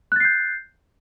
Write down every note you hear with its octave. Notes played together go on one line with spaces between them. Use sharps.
F#6 G6 A6 C7